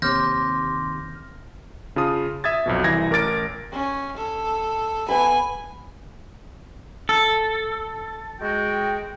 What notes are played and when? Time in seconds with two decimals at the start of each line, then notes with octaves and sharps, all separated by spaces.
0.02 D#2 C3 C6 D6 F6 G6 A#6
1.96 C#3 F4 A5 D#6
2.44 E5 D#6 G#6 A6
2.66 B1 F2 B2
2.84 C2 E3 G#6 A#6
3.11 A1 A#4 D6 A6 D7
3.72 C#4
4.17 A4
5.09 B3 E5 G#5 B5
7.09 A4
8.40 G#3 F#4 G5